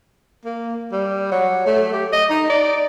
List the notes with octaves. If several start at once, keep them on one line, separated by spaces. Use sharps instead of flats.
A#3
G3
F#3
A3
G4
D#5
D#4
D5